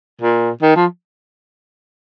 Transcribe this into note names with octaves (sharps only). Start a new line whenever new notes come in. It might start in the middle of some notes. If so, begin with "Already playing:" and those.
A#2
D#3
F3